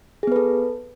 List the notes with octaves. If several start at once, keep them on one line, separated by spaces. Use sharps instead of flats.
B3 G#4 A4 B4